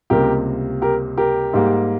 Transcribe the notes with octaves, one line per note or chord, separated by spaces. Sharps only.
C#2 C3 G3 A#3 G4 A#4
G4 A#4
G4 A#4
G#2 G3 A#3